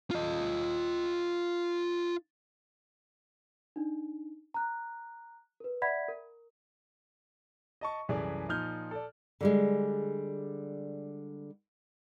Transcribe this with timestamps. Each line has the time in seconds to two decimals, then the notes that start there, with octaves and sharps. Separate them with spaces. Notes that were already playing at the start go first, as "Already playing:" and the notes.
0.11 F4 D#5
3.76 D4 D#4
4.54 A#5 F#6
5.60 A#4 B4
5.82 D5 E5 F#5 B5 G#6 B6
6.08 A#4
7.81 D#5 A5 C#6
8.09 C2 F#2 E3 G#4 A4 D5
8.49 A#2 F3 D#4 F6 G6
8.91 A4 D5
9.41 D3 G3 G#3